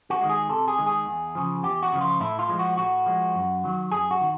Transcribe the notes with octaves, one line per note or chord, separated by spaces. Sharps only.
F#4
D#3 G#3
G#4
C3 A4
G#4
D#3 G#3
G#4
E2
C#3 F3
E2 G4
F#4
C#3 F3
F4
A2 E4
F4
F3 G#3
F#4
A2 F#4
F3 G#3
F#2
D#3 F#3
F#2 G#4
F#4
D#3